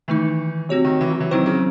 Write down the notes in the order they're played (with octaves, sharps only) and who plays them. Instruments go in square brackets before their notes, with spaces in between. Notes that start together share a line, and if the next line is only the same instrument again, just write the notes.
[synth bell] D#3 A3 D#4 [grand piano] E3
[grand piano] C3 [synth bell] C4 F#4 C#5
[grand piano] D#3
E3
F#3
E3
[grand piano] D#3 [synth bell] F#3 C4 E4 C5
[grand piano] C#3